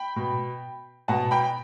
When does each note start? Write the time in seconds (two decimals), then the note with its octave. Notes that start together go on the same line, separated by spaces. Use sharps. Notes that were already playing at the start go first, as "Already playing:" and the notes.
Already playing: G5 B5
0.16 B2
1.08 B2 F#5 A5
1.31 G5 B5